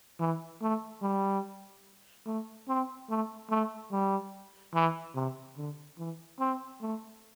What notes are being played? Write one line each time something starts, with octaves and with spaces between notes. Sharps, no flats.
E3
A3
G3
A3
C4
A3
A3
G3
E3
C3
D3
E3
C4
A3